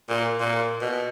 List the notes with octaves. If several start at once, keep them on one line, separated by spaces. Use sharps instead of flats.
A#2
A#2
B2